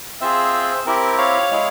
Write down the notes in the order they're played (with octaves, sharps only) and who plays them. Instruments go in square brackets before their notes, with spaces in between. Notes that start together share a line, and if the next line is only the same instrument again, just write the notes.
[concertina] C4 F4 G#4 C5 E5
C4 E4 G4 A#4
C#5 F5
G#3 E4 G#4